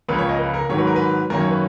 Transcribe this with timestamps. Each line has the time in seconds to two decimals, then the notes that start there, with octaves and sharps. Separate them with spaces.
0.08 C#2 C#3 F3 A#3 B4
0.18 C#5
0.29 D#5
0.39 B4
0.54 A#4
0.69 G#2 D#3 F#3 C#5
0.78 B4
0.87 A#4
0.96 B4
1.30 F#2 D#3 A#3 C#4 A#4
1.40 C#5
1.51 B4